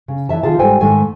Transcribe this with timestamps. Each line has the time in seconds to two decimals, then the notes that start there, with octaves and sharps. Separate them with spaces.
0.08 C#3
0.29 E3 G#3 E5 A5
0.43 D#3 F4 G#4 A5
0.59 G#2 G3 A4 C5 G5 G#5
0.81 G#2 D#3 A3 G#5